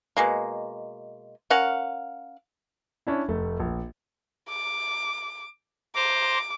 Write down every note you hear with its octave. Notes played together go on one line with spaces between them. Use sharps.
B2 G#3 A#3
C#4 A#4 F5 F#5
C#4 D4 E4
F1 A3
A#1
D6
C5 A#5 D6